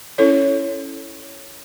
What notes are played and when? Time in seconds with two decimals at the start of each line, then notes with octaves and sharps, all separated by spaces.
0.18 C#4 E4 A4 C#5